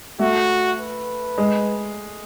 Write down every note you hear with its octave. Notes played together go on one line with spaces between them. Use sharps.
A3 F#4
B4
G#3